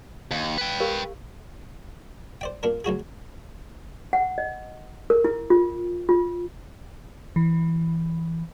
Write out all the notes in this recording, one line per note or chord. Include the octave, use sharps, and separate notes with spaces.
D#2 F#5 G#5
B4 G5
G4 A#4 F5
C5 D5 G5
A#2 D4 A#4
D2 F#3 F#4 G#4
F#5
D#5
A#4
E4
F4
F4
E3